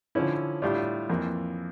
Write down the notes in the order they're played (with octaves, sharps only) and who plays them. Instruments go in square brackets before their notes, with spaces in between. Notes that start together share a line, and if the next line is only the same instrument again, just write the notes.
[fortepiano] D3 F3 C#4 E4
A2 G3 D4 F4
F2 E3 A#3